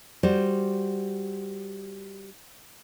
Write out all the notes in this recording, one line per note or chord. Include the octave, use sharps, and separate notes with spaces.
G3 F#4 C5